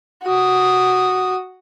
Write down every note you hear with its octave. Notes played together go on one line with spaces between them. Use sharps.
F#4 D#6